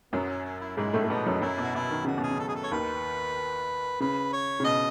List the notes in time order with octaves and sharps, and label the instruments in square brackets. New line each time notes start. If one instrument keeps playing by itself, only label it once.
[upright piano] F#2 F#3 [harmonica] B3
[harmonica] C#4
C#4
E4
[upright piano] G#2 G#3 [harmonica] E4
[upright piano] A2 A3
A3
[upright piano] B2 B3 [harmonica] D#4
[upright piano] F#2 F#3
[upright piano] F#2 F#3 [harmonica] E4
[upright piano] B2 [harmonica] F#4
[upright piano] B2 [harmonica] E4
[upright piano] D#3
[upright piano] C#3 [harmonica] F#4
[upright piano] B2
[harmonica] G#4
[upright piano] C#3
[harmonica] A4
G#4
A4
C#5
[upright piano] D#2 D#3 [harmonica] B4
[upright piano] C#3 [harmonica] B4
[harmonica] C#5
[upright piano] C#3
[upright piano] B2 [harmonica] D#5